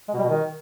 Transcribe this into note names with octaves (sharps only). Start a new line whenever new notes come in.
G#3
B2
G3
B2
D#3